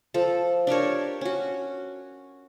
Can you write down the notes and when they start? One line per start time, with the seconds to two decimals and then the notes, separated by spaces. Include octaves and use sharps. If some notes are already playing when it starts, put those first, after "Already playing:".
0.14 F3 A4
0.67 D4 G4 A#4 C#5
1.21 C#4 F#4